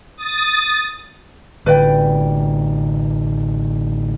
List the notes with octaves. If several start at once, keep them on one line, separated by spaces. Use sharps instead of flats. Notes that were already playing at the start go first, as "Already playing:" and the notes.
D#6 A6
A1 D3 B4 D5 G5